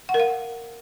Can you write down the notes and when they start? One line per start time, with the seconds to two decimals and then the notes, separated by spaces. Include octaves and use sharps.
0.09 F#5
0.14 A#4
0.20 F5